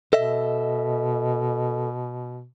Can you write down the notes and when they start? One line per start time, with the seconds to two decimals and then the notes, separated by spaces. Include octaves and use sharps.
0.13 B2 A4 D#5 E5